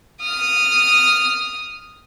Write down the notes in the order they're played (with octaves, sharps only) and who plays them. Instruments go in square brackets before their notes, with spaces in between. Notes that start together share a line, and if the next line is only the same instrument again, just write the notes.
[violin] D#6 F6